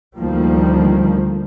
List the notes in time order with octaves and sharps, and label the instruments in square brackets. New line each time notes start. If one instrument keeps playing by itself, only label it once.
[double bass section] D2 D#3 F3 G3 A#3